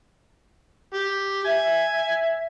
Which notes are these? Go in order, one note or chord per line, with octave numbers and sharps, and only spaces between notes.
G4
E5 G#5